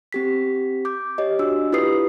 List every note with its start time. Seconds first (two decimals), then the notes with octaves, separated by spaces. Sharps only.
0.13 C4 G4 B6
0.85 D6 G6
1.18 G4 C#5 D#5
1.39 D4 F#4 E6
1.73 E4 F4 G4 B4 D#6 C7